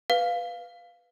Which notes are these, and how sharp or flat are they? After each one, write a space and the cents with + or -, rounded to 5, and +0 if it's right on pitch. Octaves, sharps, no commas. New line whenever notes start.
B4 +0 F5 +0